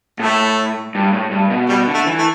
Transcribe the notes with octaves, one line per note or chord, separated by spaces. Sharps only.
A2 A3
G2
A2
G2
B2
B2 G3
D3
A3
E3
A3